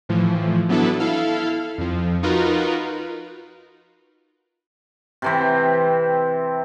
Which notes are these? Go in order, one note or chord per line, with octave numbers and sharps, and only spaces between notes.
A2 E3 F3
F#3 B3 D4 E4 A4 B4
E4 A4 F5
F2 F3
D#4 F4 F#4 A#4 B4
C3 E3 C4